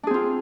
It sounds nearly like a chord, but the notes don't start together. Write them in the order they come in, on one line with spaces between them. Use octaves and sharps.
D4 G#4 C4 F4